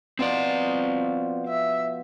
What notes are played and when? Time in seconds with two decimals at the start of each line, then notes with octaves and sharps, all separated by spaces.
0.19 B2 F3 C4 F4 D5
1.48 E5